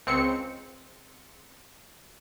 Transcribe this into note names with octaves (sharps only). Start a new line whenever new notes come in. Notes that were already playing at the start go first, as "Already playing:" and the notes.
C#2 C4 C#7